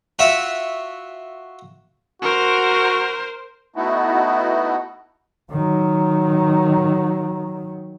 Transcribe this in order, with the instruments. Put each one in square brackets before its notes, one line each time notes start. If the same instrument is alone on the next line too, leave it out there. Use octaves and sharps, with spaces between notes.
[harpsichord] F4 F#4 E5
[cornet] F#4 [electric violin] A#4 C5
[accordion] A3 B3 D#4 E4 F#4
[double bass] D#3 F#3